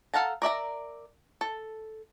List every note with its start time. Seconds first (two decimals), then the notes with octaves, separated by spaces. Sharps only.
0.14 A4 F5 F#5 A5 A#5
0.42 A#4 D5 E5 A#5
1.41 A4